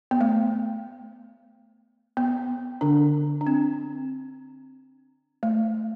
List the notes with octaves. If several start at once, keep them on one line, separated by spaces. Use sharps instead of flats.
B3
A3
B3
D3 D4
D4
C4
A3